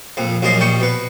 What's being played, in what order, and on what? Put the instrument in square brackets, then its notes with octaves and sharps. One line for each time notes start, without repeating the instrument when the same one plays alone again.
[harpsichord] A#1 F2
A#1 F#2 F3 A#3 D#5 C6
A#1 G3 G5 C#6
B2 B4